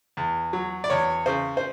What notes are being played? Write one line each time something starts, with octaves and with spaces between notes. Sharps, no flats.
E2
F#3
D5
E2 C#5
C#3 C5
C5